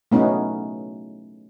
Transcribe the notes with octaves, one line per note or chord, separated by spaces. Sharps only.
A3 B3 C#4 D#4